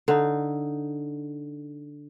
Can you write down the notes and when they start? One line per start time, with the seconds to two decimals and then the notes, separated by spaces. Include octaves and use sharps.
0.08 D3 D#4